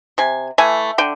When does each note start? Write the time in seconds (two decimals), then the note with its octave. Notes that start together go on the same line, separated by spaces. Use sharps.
0.18 C3 G#5
0.58 E3 A3 G#5
0.98 D3 G5